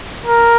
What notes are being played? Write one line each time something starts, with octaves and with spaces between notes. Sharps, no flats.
A#4